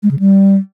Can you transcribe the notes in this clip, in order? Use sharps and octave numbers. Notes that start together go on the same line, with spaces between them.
G#3
C#3
G3